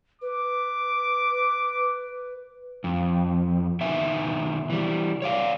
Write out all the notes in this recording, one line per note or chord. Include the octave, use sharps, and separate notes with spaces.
B4 D6
F2
B2 D#3 E5 G#5
E3 G3
C#5 D5 F5